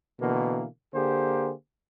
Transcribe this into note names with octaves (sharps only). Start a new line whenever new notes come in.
B2 D3 E3 A#3
D3 A#3 G4 G#4 C5